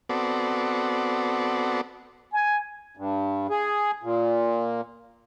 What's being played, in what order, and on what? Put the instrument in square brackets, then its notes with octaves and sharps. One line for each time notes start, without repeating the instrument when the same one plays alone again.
[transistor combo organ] B3 C4 F#4 A4 D5
[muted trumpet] G#5
[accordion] G2
G#4
A#2